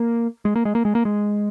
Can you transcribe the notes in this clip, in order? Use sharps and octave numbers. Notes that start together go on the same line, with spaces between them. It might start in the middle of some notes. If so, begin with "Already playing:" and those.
Already playing: A#3
G#3
A#3
G#3
A#3
G#3
A#3
G#3